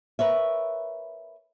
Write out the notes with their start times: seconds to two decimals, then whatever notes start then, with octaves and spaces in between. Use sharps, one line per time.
0.19 A#4 B4 C#5 E5